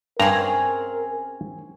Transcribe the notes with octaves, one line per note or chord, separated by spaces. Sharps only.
G2 C4 C#4 G#4 A#4 A#5